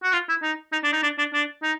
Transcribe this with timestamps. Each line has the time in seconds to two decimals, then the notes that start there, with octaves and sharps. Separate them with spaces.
0.03 F#4
0.13 F4
0.29 E4
0.43 D#4
0.73 D#4
0.84 D4
0.93 D#4
1.03 D4
1.18 D4
1.33 D4
1.63 D#4